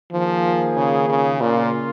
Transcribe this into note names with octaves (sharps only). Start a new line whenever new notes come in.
D#3 F3 A#3 F4 G#4
C#3
C#3
A#2 C#3 A#3 F4